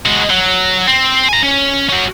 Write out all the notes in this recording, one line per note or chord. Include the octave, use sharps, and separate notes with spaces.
G#3 F#4
F#3
C4
G#5 A#5
C#4
C#4 F#4